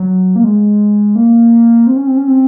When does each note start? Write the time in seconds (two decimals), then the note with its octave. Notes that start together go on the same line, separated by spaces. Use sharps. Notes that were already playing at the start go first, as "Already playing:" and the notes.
Already playing: F#3
0.36 A#3
0.44 G#3
1.15 A#3
1.87 C4
1.96 C#4
2.07 C4
2.17 C#4
2.28 C4